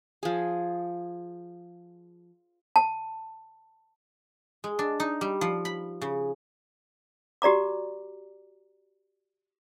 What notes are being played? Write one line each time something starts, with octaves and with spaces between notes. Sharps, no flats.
F3 G#4
A5
G#3
D4
D#4
G3
F3
B5
C#3
F#4 G4 D5 A#5 D6